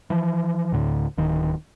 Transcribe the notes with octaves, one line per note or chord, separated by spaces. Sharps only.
E3 F3
D2 A2 D3
D1 D#3